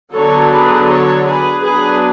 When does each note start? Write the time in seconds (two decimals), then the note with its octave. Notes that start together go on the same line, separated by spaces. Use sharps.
0.15 D3 F#3 B3 D4 A4 C#5
0.51 G#4 B4
0.89 A4 C#5
1.26 G#4 B4
1.62 F#3 B3 D4 G#4 B4